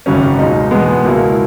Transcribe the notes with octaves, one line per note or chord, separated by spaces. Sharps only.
G#1 F#2 C#3 F#3 C#4
C#2 B2 G#3 D#4
E2 B2 G#3 B3
C#2 B2 A#3 E4